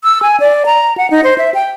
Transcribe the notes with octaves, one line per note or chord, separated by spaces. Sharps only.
E6
G#5
D5
A#5
F#5
D#4
C5
E5
G5